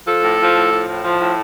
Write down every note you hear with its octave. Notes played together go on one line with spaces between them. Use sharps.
F3 A4
A2
F3
A2
F3
A2
F3
A2